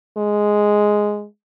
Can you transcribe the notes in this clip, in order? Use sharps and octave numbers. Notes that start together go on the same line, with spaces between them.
G#3